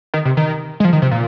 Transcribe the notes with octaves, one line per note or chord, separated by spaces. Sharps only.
D#3
C3
D#3
G#3
F3
D#3
C3
A#2